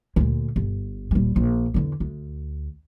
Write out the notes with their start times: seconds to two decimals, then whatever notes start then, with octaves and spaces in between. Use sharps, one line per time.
0.16 D2 A#2
0.56 G1
1.11 D#1 G3
1.36 A#1
1.74 E2 D3
2.00 D2